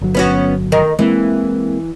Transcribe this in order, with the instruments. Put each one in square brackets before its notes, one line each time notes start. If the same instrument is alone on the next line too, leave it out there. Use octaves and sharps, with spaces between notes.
[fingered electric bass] G1 F#3
[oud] B3 C#4 F#4
D#3 A#4
[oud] E3 [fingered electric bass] G#3 A#3 C4